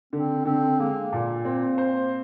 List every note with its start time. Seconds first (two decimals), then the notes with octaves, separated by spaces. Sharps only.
0.13 D3 C4
0.45 D3 C4
0.79 G#3 A#3
1.13 A#2
1.45 C4
1.78 C5